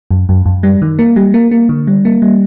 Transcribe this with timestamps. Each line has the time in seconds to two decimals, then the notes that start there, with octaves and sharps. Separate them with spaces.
0.11 F#2
0.29 F#2
0.46 F#2
0.63 G3
0.82 D#3
0.99 A#3
1.16 G3
1.34 A#3
1.51 A#3
1.69 D3
1.87 G3
2.05 A#3
2.22 G3